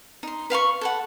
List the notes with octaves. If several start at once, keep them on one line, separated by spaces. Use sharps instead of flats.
D#4 C6
B4 F5 B5 C#6
A4 B4 F#5